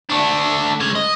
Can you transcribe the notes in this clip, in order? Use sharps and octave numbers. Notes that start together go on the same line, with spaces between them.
A3 D4
G#3 C#5
D#5